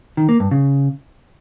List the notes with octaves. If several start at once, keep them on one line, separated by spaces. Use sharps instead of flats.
D#3
A#3
G2
C#3